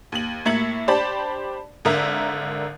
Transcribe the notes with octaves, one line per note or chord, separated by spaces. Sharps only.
D#2 F#7
A2 A#3 E5 G#6 C#7 F#7
D4 G4 C5 D5 A5 B5
G#1 D3 A#4 E5